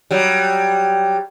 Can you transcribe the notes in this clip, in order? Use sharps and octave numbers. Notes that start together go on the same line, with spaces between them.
F#3 G3